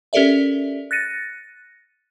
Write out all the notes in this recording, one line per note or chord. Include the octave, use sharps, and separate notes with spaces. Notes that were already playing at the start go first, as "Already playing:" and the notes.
C#4 G4 A4 A#4 D5 E5
F#6 A6 A#6 C#7 D#7